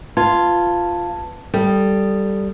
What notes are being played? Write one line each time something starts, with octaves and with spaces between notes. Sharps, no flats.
F4 B4 A5 G#6
G3 A4